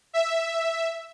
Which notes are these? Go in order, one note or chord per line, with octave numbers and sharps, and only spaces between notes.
E5